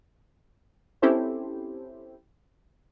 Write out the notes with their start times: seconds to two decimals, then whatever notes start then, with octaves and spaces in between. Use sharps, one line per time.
1.02 C4 C#4 E4 G4 A4 C5